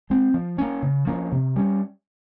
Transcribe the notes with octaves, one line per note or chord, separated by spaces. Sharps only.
G#3 C4
F3
A#3 C#4
C#3
F3 A#3 C#4
C3
G3 C#4